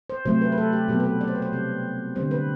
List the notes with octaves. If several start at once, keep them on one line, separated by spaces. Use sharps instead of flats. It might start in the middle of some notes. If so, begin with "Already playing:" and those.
C5
C3 F#3 A3 C4 C5
B4
B4
A4
G4
B2 F#3 B3 G4
B4
A4
D5
C5
B4
C5
C3 G3 C4
D3 G3 C4 C5
B4